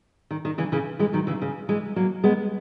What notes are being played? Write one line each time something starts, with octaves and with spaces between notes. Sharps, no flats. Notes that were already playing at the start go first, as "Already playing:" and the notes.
D#3
D#3
C#3 E3
C#3 E3
E3 G#3
D#3 F#3
C#3 E3
C#3
E3 G#3
F#3 A#3
G#3 B3